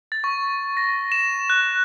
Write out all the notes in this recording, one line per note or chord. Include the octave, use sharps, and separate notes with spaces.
A6
C#6
A#6
E7
F#6